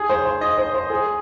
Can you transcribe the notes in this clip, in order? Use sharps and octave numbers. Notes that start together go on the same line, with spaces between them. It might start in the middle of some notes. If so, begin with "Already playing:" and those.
Already playing: G#4
C5
C5
D#5
C5
C5
G#4